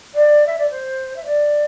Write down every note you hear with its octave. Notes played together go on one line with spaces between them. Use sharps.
D5
E5
D5
C5
E5
D5